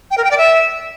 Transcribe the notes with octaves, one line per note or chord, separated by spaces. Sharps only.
G5
A#4
G5
D5
E5